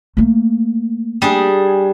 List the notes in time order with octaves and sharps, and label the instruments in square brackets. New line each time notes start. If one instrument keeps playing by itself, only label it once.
[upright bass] A3 A#3
[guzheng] G3 D4 G#4